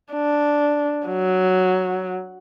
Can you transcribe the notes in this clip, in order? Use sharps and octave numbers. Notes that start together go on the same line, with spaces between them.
D4
F#3